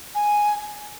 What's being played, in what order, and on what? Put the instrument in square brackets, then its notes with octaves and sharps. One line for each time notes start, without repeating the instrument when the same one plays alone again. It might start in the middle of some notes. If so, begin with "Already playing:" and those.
[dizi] G#5